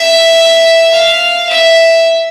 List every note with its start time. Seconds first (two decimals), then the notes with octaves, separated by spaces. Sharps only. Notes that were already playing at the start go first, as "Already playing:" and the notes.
Already playing: E5
0.93 F5
1.49 E5